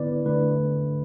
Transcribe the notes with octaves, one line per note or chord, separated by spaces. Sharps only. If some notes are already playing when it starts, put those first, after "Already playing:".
Already playing: D3 B3 E4 B4 D5
D3 A3 D4 B4